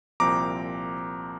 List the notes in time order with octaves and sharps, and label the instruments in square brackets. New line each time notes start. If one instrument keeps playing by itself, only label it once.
[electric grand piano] C2 A#2 F3 C4 A#5 D6